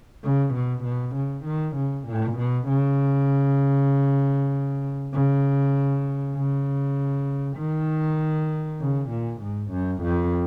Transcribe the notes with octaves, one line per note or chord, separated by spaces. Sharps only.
C#3
B2
B2
C#3
D#3
C#3
A#2
B2
C#3
C#3
C#3
D#3
C#3
A#2
G#2
F#2
F2